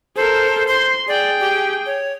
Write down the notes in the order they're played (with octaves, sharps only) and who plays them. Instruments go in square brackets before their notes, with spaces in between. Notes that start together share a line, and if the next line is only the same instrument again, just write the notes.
[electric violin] A4 A#4 [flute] C5
[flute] C5 [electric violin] C6
[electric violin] G#4 G5 [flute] D5
[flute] G4
C#5